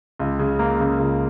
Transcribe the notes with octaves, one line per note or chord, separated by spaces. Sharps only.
C#2
C#3
A#3
C#3
C#2